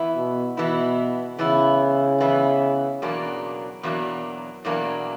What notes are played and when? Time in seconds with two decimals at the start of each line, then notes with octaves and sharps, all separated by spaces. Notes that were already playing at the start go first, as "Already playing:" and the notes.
Already playing: E3 B3 E4
0.16 B2
0.57 B2 E3 B3 E4
1.39 C#3 E3 B3 E4
2.20 E3 B3 E4
3.02 E2 B2 F#3 A#3 D4
3.83 E2 B2 F#3 A#3 D4
4.65 E2 B2 F#3 A#3 D4